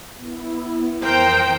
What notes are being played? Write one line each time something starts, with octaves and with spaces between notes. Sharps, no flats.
B3 E4
F2 E3 A#4 C5 G5 D#6